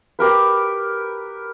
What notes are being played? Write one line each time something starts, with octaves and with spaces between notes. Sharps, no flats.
G4 A#4 B4